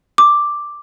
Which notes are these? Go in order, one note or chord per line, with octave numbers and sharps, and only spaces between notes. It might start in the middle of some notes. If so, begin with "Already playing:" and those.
D6